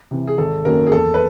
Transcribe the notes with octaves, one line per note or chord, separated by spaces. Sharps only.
C3 E3
G#4
G#1 A4
F#2 D#3 F#3 A#3 A#4
G#4
E2 A4
B4